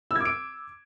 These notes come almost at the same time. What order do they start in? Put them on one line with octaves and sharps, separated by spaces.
E6 G#6 D6 D7